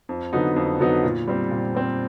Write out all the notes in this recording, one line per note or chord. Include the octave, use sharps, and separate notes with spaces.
F2
D3 F#3 B3 D#4
F2
D3 F#3 B3 D#4
A#2
G3 C4
A#2
G3 C4